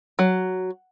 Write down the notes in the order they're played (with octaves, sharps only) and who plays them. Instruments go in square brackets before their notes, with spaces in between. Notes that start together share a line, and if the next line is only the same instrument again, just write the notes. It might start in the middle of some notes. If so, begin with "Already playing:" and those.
[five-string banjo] F#3